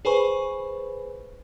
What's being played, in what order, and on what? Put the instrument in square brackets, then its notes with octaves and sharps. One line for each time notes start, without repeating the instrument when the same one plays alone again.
[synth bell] G#4 B4 C5 G#5 B5 C#6